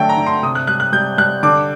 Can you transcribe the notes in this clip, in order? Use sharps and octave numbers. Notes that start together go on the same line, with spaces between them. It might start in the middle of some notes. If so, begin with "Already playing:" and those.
Already playing: D3 F#3 A3 G5
A#5
D3
C6
C3 D#6
F#6
G3 F#6
F#6
G3 G6
G3 F#6
D3 D6